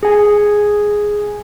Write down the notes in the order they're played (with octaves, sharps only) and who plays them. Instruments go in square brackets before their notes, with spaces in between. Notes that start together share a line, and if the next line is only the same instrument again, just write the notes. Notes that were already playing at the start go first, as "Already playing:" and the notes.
[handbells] G#4 G#5